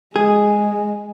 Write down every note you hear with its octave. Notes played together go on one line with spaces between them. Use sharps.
G#3 G#4